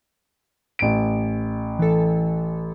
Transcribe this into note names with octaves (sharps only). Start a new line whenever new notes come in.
A1 D7
E3 A4